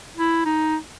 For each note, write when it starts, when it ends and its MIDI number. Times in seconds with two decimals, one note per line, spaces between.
0.17 0.44 64
0.45 0.76 63